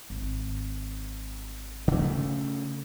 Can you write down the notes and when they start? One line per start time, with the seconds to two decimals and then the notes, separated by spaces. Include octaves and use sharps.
0.10 G#1
1.88 C#3 A3